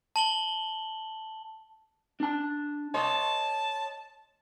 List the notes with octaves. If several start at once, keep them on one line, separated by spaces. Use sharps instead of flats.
A5 F#7 G7
D4 A5
C#5 D#5 A5 C6